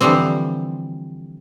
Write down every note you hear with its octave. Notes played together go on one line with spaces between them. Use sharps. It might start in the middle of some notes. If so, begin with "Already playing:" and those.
D3 E3 F3 G3 C4